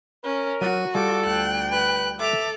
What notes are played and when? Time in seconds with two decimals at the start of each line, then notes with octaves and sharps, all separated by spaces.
0.24 C#4 A#4
0.61 F#3 F#4 D#7
0.95 G3 F4 A4 D6
1.25 D2 G5 F#6
1.72 B4 F#6
2.20 A4 E5 D6 F7